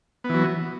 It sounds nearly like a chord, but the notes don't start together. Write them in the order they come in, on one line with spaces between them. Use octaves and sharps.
B3 E3 F#3